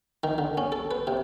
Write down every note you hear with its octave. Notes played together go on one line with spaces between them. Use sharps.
D#3
D3
C#4
A4
B4
C3